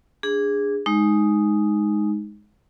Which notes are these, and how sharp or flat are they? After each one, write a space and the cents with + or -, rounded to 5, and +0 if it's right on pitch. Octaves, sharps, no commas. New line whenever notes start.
D4 -10 G#4 -15
G#3 +10 D#4 +0